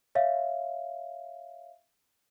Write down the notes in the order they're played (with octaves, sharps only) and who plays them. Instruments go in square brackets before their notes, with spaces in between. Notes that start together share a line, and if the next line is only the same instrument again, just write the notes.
[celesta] C#5 E5 F5